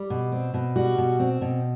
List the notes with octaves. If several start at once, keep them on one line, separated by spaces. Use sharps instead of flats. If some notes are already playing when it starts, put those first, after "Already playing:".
Already playing: G3
B2
C4
B2
G3 F#4
B2
C4
B2